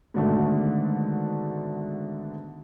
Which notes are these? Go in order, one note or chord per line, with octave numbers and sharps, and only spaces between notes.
G#2 B2 D3 D#3 A3